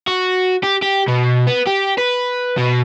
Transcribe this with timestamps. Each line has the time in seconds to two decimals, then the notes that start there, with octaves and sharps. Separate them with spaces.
0.08 F#4
0.63 G4
0.82 G4
1.08 B2
1.47 B3
1.67 G4
1.98 B4
2.57 B2